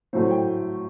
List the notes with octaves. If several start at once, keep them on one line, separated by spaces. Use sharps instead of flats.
A2 F#3 A3 C5
G5